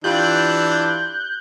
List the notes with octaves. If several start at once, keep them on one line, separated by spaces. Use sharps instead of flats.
E3 D4 F4 G4 F#6 G6